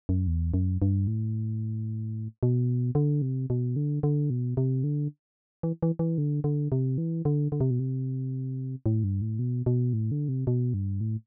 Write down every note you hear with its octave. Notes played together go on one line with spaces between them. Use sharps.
F#2
E2
F#2
G2
A2
B2
D3
C3
B2
D3
D3
B2
C3
D3
E3
E3
E3
D3
D3
C3
E3
D3
D3
C3
B2
C3
A2
G2
A2
B2
B2
A2
D3
C3
B2
G2
A2